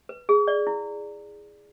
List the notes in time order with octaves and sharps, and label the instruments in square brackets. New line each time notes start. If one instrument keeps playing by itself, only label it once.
[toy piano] B4
G#4
D5
E4